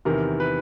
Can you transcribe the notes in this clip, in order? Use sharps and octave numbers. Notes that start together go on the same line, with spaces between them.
E2 C3 D#3 A#4
B4